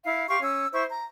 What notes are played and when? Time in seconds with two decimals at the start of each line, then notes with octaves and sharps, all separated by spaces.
0.04 E4 F5
0.28 G4 F5 C6 C#6
0.42 C#4 E6
0.73 E4 C5 C#6
0.89 A#5